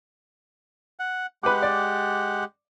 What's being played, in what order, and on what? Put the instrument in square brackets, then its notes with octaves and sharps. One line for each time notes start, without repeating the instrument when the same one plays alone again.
[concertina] F#5
[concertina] G#3 G4 F#5 [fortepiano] B4 D6
[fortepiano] D5